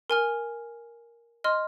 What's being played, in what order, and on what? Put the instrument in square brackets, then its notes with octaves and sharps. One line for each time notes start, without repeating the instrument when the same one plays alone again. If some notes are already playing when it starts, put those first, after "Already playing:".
[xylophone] A#4 G#5 F6
D#5 C6 F6